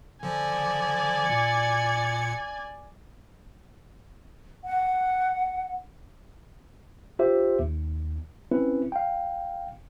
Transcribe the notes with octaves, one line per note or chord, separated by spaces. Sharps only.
D3 F3 D5 G#5
A#2 C#7
F#5
F4 G4 C5 E5
D#2
C4 C#4 E4 B4
F5 G5